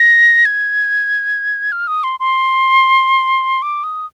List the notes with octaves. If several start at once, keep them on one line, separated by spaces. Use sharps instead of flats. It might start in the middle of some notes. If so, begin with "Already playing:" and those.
Already playing: A#6
G#6
F6
D#6
C6
C6
D6
D#6